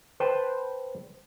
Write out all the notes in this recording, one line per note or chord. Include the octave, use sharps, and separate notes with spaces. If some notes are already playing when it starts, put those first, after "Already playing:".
B4 C5 G5 A5